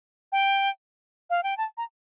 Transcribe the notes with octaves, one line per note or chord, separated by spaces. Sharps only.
G5
F5
G5
A5
A#5